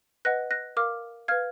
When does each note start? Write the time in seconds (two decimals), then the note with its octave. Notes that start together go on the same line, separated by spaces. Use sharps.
0.25 B4 D#5 F#5 F#6 A#6
0.51 F#6 A#6
0.77 A#4 F5 D6 F6
1.28 B4 F5 F6 G#6